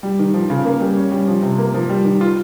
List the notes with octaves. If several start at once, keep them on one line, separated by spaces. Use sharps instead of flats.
G3
D#3
F3
C#3
A#3
G3
C#4
G3
F3
C3
A#3
F3
G3
D#3
F4